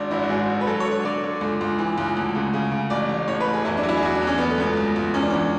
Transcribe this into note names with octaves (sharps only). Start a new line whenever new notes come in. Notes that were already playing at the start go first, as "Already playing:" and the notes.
Already playing: G#1 D4
G#1 E4
F#4
G#2 G#4
G#1
B4
F#3 A4
C#5
D3
C#5
D3 D5
D3
C#2
C#2
E3
C#2
D2
C#3
C#3
C#3
A1 D5
A1
A2 C#5
B4
A1
G#4
E2 E4
D4
F#3
E4
G#4
E2 F#4
D4
E2
C#4
F#3 B3
A3
C#2 B3
C#2
C#2
E2 C#4
D4
E2 C#4